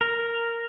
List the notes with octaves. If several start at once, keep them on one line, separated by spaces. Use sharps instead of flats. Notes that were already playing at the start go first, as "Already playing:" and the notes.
A#4